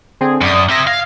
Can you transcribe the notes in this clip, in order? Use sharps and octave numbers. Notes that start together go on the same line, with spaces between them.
D3 C4 G#4
F#2 D5 D#6
C4 E5 D#6 G#6 A#6
F5